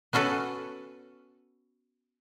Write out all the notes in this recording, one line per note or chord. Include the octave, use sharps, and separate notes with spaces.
B3 C#4 F#4 A4 B4